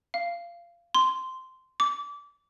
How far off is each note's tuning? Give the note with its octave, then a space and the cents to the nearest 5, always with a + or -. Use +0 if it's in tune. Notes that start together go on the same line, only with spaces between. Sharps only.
F5 -20
C6 -10
D6 -25